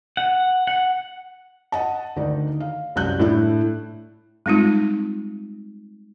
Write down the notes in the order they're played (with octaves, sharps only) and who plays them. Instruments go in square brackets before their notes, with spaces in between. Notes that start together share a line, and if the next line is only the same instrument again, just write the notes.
[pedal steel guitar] F#5
F#5
[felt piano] D#5 F#5 A5
D2 D#3 D#4 D5
F5
C2 F#2 F#6 G6
A2 A3 D4 E4
[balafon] G3 G#3 C4 D#4 F4